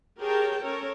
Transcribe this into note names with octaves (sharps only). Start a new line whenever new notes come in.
G4 G#4 A#4 C#5 G5 A5
C#4 A4 A#4 C#5